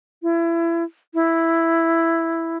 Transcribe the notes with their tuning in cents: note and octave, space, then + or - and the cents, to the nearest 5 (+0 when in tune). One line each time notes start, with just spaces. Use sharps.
E4 +30
E4 +5